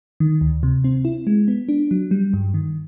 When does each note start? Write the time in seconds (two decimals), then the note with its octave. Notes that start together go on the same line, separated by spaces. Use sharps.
0.20 D#3
0.41 D2
0.63 C3
0.84 C4
1.05 E4
1.27 G#3
1.48 B3
1.69 D4
1.91 F#3
2.11 G3
2.33 G2
2.54 D#3